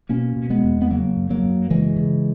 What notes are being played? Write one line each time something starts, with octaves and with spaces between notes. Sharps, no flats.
B2 A#3 C#4
B2
G#3 B3
E2
B3
C#3 F#3 A#3
F#2
F#3 A#3
F#2
C#3 E3 G#3
C#3